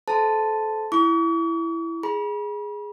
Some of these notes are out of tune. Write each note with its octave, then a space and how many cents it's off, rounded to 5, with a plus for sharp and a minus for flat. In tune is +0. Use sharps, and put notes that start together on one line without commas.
A4 -25 C5 -20 A5 +0
E4 +10 C#6 +45
G#4 +0 B5 -40